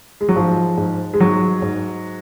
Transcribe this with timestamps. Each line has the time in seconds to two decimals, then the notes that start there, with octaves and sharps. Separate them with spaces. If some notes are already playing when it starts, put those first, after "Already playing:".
0.21 G#3
0.29 F#3
0.36 G#2 F3
0.77 G#2
1.14 G#3
1.20 G#2 F#3
1.62 G#2